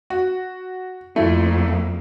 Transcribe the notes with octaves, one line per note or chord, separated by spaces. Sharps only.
F#4
F2 A3 A#3 E4